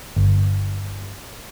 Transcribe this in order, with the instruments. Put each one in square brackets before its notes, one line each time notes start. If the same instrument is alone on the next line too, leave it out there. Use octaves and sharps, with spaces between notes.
[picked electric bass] G1